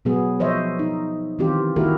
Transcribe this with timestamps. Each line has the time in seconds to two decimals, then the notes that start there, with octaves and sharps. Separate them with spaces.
0.05 B2 F#3 B3 G#4
0.40 F3 C5 C#5 D#5 E5
0.79 D#4
1.39 D#3 E3 C4 F4 G4
1.76 D#3 A#3 E4 F#4 G4 A#4